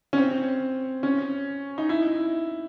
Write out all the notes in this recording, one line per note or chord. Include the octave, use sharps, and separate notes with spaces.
C#4
C4
C#4
D#4
E4